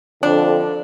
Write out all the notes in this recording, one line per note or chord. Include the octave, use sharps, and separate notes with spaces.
F2 D3 D4